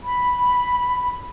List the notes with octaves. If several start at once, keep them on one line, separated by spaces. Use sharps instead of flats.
B5